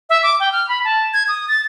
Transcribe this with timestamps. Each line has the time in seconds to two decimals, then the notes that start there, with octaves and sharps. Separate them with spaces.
0.10 E5
0.23 D6
0.40 G5
0.52 F6
0.69 B5
0.84 A5
1.13 G#6
1.28 D#6
1.48 A6